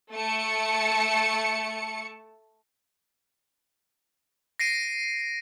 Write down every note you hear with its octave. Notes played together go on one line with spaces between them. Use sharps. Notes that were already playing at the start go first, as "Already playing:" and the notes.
A3 A5 C#7
A#6 C7 D7 D#7